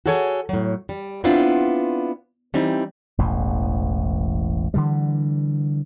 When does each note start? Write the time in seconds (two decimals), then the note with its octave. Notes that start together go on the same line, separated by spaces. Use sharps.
0.06 F#4 G#4 A4 C#5 E5 G#5
0.49 A2 F#3
0.89 G3
1.24 B3 C4 D4 E4 F4
2.54 E3 G3 C4 D#4
3.18 E1 A1 E2
4.74 D3 E3 G3